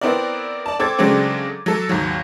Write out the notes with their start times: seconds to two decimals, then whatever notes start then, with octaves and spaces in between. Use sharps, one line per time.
0.01 B3 C4 E4 A#4 D5
0.66 D5 A5
0.79 C4 A4 D6 G#6 A6
0.98 C#3 F#3 G#3 A3 C4 D4
1.66 F#3 A4
1.89 G#1 D#2 F#3